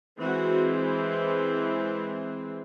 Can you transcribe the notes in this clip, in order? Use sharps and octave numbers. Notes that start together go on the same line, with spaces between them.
E3 G#3 C4 F#4